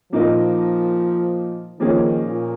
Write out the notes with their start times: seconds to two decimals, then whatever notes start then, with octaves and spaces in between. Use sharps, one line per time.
0.12 A#2 F3 A#3 D#4 A#4 D#5
1.79 D#3 F3 A#3 C#4 G#4 C#5
2.22 A#2